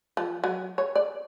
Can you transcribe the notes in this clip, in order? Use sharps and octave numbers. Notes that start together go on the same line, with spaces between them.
F3
F#3
C#5
D5